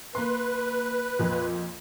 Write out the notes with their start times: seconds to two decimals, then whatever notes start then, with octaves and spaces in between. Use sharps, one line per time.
0.15 A#3 B4 C6
1.19 F2 A#2